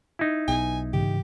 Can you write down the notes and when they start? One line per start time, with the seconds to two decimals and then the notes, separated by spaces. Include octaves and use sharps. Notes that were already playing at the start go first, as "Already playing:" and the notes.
0.19 D#4 E4
0.48 B1 B2 G#5
0.94 G#2 C#3 E3 G4